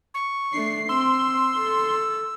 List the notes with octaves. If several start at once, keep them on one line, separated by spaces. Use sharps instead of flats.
C#6
A3 D4 C7
C4 C6 E6
A4